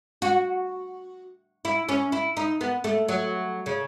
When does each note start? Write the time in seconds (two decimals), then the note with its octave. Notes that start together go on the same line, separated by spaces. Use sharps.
0.22 F#4
1.65 E4
1.89 C#4
2.12 E4
2.37 D#4
2.61 B3
2.84 A3
3.08 F#3
3.66 C#3